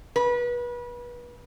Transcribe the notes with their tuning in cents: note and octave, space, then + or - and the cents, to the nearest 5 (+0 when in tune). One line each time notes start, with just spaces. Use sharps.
B4 -30